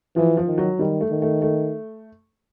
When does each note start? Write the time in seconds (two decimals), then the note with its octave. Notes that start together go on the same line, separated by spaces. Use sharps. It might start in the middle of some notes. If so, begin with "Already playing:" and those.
0.16 E3 F3
0.37 F3
0.47 D#3
0.58 F#3
0.79 D#3 G3
1.01 A3
1.11 D#3
1.22 A3
1.42 A3